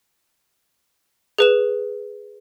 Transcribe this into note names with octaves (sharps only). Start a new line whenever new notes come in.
G#4 B4 E7